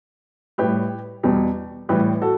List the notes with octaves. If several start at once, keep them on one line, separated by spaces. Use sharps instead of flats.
A2 G3 G4 B4
E2 B2 G3
A2 E3 G3 G4 B4
F#4 A4